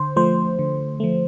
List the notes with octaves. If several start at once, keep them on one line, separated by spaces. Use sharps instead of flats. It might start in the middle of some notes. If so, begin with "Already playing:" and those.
Already playing: D3 C5
F3 A3 C5
D3
F3 A3